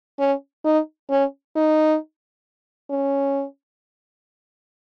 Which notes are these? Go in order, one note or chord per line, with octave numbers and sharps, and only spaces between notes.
C#4
D#4
C#4
D#4
C#4